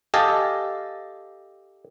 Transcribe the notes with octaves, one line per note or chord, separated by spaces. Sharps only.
G4 A4 D#5 F5 G#5 A5